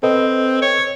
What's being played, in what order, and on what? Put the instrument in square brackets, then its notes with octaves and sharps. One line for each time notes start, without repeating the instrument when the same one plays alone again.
[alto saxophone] C4 [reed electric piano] A4 B4 D#5
[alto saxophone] C#5